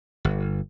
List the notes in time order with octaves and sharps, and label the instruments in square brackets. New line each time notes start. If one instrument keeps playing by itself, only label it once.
[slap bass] G1